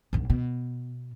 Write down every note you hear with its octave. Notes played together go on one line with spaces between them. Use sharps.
B1 G2
B2